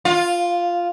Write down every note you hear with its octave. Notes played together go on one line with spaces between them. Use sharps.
F4